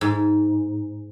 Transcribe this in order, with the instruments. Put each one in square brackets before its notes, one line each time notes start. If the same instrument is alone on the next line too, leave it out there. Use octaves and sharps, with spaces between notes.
[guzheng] G#2